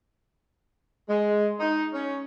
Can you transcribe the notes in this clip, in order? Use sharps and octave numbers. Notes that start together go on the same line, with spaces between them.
G#3
D#4
C#4